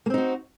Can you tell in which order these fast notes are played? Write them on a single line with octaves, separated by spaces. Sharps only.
A#3 C4 D#4 F#4